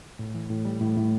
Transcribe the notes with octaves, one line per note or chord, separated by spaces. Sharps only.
A2
E3
A2
G3
A2
A2